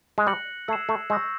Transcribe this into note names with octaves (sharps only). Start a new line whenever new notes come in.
G#3
G3 F#6 A#6 C#7 F#7
A3 E6 G#6 C7 E7
A3
G#3 C#6 E6 G6 A#6